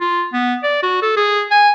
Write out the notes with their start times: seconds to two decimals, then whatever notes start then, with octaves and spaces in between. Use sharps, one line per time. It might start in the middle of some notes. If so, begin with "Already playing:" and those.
0.01 F4
0.33 B3
0.64 D5
0.83 F#4
1.02 A4
1.17 G#4
1.51 G#5